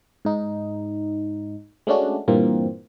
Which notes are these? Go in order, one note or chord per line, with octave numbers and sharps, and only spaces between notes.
G#2 D#4
G#3 A3 C#4 D4 F#4
G2 A#2 E3 A#3 C4